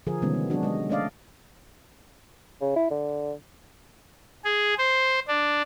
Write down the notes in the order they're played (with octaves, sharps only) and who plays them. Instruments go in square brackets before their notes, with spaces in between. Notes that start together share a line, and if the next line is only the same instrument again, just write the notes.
[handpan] D3 F3 G#4 A#4
C3 D#3 G3 G#3 B3 C#4
B3
F#3 B3 D4 F#4
G#3 D#5
A3 C#4 D4 D5 D#5 F5
[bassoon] C#3
E4
D3
[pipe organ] G#4
C5
D4